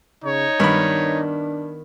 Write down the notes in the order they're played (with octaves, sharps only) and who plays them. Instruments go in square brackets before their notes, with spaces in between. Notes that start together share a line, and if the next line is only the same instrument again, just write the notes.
[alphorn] C#3 [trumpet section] D#4 C#5
[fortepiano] G2 B5 [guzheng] D#3 B3 [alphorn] D4